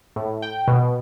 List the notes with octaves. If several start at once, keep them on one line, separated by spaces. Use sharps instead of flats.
A2
G5
B2